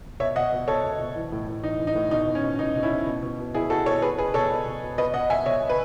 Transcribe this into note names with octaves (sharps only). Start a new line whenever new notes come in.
B2 C#5 E5
B2 D#5 F#5
B2
B2 A4 C#5
B2
B2
E3
A2
A2
E3 D#4
E3
D#4
A2
B2 D#4
B2
C#4
B2
B2 D#4
B2
C#4 E4
B2
B2
B2
B2
B2 E4 G#4
B2 F#4 A4
B2 A4 C#5
B2 G#4 B4
B2 G#4 B4
B2 A4 C#5
B2
B2
B2
B2 B4 D#5
B2 D#5 F#5
B2 E5 G#5
B2 C#5 E5
B2
B4